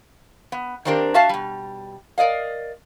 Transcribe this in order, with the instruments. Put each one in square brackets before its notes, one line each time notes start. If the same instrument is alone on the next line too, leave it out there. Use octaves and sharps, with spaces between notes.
[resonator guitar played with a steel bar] B3
D#3 A#3 C4 D4 G4 A#4
F#4 E5 F5 A5
B2 G3
A#4 D5 D#5 F5